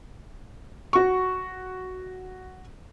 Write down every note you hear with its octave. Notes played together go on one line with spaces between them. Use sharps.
F#4 C#6